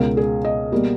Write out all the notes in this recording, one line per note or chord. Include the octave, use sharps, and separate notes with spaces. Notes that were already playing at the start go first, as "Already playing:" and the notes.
Already playing: C#2 B2 G#3 A#4
G#4
D#5
B2 G3 A#3